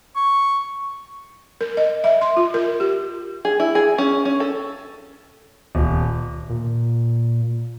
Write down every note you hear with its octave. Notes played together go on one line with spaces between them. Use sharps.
C#6
A#4
D#5
E5
C6
F4
A#4
G4
G#4
E4
G#4
C#4
C#4
A4
D#1
A#2